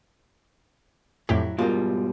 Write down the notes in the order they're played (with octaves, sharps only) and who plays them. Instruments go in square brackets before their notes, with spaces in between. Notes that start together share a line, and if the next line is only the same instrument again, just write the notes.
[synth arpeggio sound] F2 A2 G4 [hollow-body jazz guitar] F#3 E4
[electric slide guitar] G#2 B2 G3 [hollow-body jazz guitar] F4 A#4